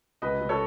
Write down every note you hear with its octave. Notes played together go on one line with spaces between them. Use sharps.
C#2 B4 D#5
C#2
A4 C#5